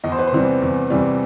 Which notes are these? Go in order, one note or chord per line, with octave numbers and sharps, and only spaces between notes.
E2 D#5
C5
B4
C5
C3 E3 G3
E2
C3 E3 G3